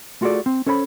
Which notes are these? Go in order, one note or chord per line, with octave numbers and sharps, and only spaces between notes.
A3 F4 F#4 G#4 A4 D5
C4
C#4 A4 C5 C#5 G#5 B5